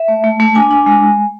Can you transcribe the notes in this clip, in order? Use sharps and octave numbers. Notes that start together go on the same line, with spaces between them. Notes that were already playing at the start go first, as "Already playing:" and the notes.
Already playing: E5
A3
A3
A3
D4 G#5
D4
G#3